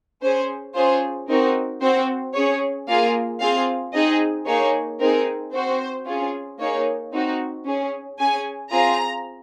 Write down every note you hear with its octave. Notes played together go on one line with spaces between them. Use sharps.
C#4 G#4 C5
C#4 F4 G#4 C5
C4 D#4 F#4 A#4
C4 F#4 C5
C#4 G#4 C#5
A#3 F4 G#4 F5
C4 F4 G#4 F5
C4 D#4 G#4 D#5
A#3 D#4 G#4 C#5
C4 D#4 G#4 A#4
C4 F#4 C5
C#4 F4 G#4
A#3 D#4 G#4 C#5
C4 D#4 F#4
C#4 G#4
C#4 G#4 G#5
C4 F4 G#4 A#5